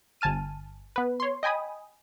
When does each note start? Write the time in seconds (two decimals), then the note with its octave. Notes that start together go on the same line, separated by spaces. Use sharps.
0.21 G1 G#5 A5 F6 D#7
0.96 B3 B4
1.20 C#5 C6
1.43 D#5 G5 G#5 B5 D#6